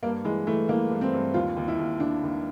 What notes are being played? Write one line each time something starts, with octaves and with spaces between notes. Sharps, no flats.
G2 A#3
E3 G#3
E3 A3
E3 A#3
G2
C4
G2
D#2 F4
D#2
E4
D#2
D#2 D4
D#2